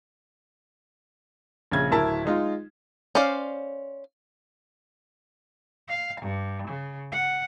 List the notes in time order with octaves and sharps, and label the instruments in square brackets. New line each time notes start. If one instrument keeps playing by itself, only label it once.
[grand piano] A#1 C#3 G#6
D1 E4 A#4 A5
G#3 D#4 F4
[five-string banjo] C#4 C5 D5 F5
[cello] F5
G2
C#3
F#5